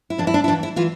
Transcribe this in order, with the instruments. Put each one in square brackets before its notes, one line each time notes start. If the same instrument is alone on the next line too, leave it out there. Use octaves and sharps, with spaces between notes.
[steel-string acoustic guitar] E4
F2 E3 D4
E4
D4
E4
F2 E3 D4
E4
E3 F4